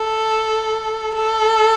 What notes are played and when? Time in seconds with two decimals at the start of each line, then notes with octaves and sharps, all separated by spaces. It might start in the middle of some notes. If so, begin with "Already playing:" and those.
Already playing: A4
1.16 A4